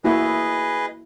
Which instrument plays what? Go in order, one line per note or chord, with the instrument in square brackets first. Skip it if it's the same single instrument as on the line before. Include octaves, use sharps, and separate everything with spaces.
[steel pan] A#3 E4 F#4 [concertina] G#4 B4 D#5